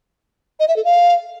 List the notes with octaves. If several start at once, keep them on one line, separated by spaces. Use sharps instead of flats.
D#5
E5
A4
F5